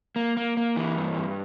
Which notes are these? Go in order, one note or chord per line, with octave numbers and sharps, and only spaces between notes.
A#3
A#3
A#3
E3
G2
G2